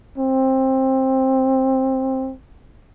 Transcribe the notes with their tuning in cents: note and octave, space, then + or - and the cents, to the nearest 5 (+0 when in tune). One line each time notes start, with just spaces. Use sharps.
C4 +15